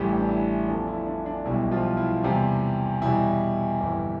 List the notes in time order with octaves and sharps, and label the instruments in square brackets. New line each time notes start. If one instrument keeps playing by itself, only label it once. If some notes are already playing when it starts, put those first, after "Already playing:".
Already playing: [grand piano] A1 A2 E3 G3 G4
D4
E4
E2 D3 F3 D4
E4
D4
D4
B1 B2 G3 E4
F3 F4
E4
E2 C3 G3
E2 B2 G3 E4
G1 F2 E3 G3